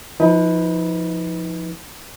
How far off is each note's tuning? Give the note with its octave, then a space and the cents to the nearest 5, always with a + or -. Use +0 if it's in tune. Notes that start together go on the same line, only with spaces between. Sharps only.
F3 +0 D#4 +40 B4 +0